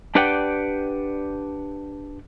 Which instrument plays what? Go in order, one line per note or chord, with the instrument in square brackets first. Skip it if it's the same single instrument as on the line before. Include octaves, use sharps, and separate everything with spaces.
[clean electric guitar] D4 G4 B4 D5 F#5 G5